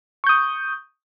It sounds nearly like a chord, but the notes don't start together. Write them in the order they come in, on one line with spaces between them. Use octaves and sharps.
C#6 G6 D#6